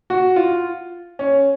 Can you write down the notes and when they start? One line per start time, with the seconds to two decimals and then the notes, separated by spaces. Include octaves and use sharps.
0.10 F#4
0.36 F4
1.19 C#4